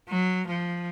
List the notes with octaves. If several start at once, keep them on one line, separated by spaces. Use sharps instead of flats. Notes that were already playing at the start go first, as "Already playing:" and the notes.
F#3
F3